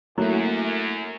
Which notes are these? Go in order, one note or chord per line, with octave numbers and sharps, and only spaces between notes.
F#2 F#3 A3 A#3 E4